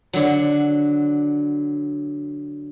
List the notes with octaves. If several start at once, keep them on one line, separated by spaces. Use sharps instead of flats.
D3 F#3